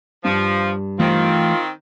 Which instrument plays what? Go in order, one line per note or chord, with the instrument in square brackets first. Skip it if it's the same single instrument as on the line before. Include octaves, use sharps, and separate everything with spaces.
[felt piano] G2 [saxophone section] F3
[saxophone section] D#3 C4 [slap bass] E3 A3 [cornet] F4